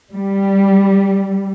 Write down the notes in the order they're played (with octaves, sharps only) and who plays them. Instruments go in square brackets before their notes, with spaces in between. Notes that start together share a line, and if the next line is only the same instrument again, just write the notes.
[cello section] G3